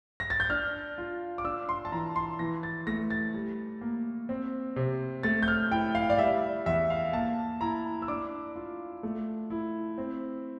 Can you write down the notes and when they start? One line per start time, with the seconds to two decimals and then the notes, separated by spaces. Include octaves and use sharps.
0.20 A#6
0.30 A6
0.40 G6
0.50 D4 F6
0.98 F4
1.38 D6
1.45 D4 E6
1.69 C6
1.85 A5
1.92 E3 A#5
2.16 C6
2.39 E3 A#6
2.63 A6
2.87 A3 A#6
3.11 A6
3.34 G3
3.81 A#3
4.29 C4
4.76 C3
5.23 A3 A6
5.42 G6
5.48 F6
5.71 E4 G5
5.95 F5
6.10 D5
6.19 G3 E5
6.66 E2 E5
6.90 F5
7.13 A#3 A5
7.61 E4 A#5
8.02 E6
8.08 D4 D6
8.56 F4
9.03 A3
9.50 E4
9.98 C4